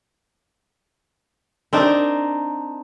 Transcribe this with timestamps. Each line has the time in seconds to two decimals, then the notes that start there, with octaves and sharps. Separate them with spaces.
1.73 C4 D4 D#4 A#4